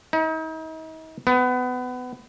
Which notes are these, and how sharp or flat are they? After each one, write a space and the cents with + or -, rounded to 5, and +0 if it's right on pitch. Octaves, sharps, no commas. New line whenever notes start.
D#4 +40
B3 +25